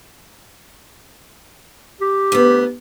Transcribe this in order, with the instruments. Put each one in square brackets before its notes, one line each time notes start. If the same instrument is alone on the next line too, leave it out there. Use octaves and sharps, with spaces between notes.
[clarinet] G4
[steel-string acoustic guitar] D2 B3